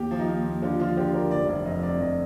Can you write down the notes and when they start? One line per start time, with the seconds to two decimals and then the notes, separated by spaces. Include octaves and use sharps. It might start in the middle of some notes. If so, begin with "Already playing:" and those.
Already playing: D#2 G4
0.11 F3
0.19 D#4
0.28 D#2 F4
0.45 D#2
0.62 D3 F4
0.79 F3 F4
0.97 D3 G4
1.14 D3 A#4
1.31 F1 D5
1.48 F1 D5
1.66 F2 D#5
1.83 C3 D5
2.00 F2 D#5